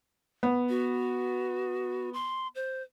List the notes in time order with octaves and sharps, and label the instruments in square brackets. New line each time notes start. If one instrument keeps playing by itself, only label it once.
[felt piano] B3
[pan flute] F#4
C6
C5